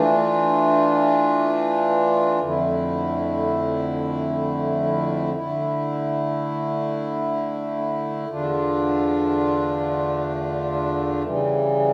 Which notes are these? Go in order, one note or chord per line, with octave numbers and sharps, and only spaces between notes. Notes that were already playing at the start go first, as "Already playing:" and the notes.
Already playing: E3 A3 D4 F4
F2 D3 A3 E4
D3 A3 E4
E2 D3 A3 D4 F4
C#3 E3 G3